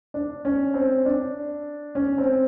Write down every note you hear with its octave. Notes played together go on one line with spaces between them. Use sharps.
D4
C#4
C4
D4
C#4
C4